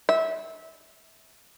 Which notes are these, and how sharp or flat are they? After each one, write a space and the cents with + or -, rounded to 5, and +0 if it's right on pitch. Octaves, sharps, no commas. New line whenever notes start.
E5 -25